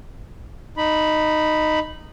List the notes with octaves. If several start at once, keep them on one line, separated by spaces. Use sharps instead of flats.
D#4 B5